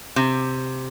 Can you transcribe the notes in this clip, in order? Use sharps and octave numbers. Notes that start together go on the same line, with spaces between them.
C3